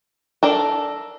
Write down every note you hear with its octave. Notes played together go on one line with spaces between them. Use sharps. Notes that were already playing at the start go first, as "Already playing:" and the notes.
D4 A4 A#4